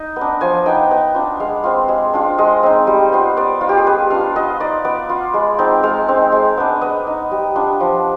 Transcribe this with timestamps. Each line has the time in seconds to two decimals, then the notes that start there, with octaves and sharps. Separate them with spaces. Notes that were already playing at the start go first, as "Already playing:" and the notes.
Already playing: D#4 D#5
0.16 B3
0.21 D4
0.41 F3 G#5
0.66 B3 D#4 G5
0.91 B3
1.14 D4 F4
1.40 G#3 F5
1.64 C4 F4
1.89 G#3
2.13 D4 F4
2.38 G#3 D#5
2.63 C4 D#4
2.87 G3
3.12 B3 F4
3.37 B3 D5
3.61 D#4 F4
3.69 G4
3.78 G#4
3.86 G3 B4
4.10 D4 F4 F5
4.35 B3 D#5
4.60 D#4 D5
4.84 B3 D5
5.09 F4
5.34 G#3
5.59 C4 D#4
5.83 G#3 F5
6.08 C4 D#4
6.32 G#3
6.58 B3 D4
6.81 B3 D#5
7.07 D#4
7.31 G3
7.55 D4 F4
7.80 F3